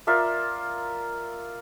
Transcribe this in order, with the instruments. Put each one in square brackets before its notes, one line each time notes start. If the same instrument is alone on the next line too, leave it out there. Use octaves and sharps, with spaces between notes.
[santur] F4 A#4 D5 E5